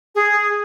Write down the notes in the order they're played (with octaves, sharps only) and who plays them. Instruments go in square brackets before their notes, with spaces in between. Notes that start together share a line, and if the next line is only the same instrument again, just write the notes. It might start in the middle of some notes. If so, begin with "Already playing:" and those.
[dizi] G#4